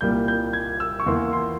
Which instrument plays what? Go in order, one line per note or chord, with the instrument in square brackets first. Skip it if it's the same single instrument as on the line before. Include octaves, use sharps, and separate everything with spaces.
[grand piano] C2 A#2 G3 A#3 G6
G6
G#6
E6
C#6
E2 E3 A#3 C6
C6